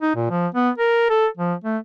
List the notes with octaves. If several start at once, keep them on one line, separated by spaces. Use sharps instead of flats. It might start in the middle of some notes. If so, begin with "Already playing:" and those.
D#4
A#2
F3
B3
A#4
A4
F3
A3